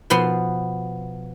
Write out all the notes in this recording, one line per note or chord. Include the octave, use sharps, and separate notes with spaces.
B2 F3 B3 C6